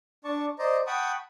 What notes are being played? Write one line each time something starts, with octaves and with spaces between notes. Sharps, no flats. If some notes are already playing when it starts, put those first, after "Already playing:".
D4 D5 A5 C#6
C5 D5 D#5 A#5
F#5 G5 A5 B5 C#6 D#6